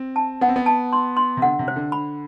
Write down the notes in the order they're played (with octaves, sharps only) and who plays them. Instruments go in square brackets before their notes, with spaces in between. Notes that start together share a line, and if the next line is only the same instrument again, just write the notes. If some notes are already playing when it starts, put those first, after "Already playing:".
Already playing: [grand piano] C4
[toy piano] A5
[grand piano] B3 [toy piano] F#5
[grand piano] C4
B3
[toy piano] A5
C6
C6
[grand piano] C3
[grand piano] D3 [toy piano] F#5
[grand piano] C3
[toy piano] C5
[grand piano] D3
[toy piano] B5